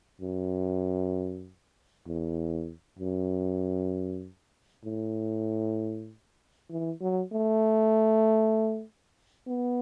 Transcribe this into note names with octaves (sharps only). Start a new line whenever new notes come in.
F#2
E2
F#2
A2
E3
F#3
A3
B3